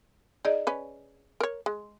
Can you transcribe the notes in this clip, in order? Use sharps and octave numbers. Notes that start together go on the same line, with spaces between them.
D#4 G#4 D5 D#5
C#4 B4
A#4 C#5
G#3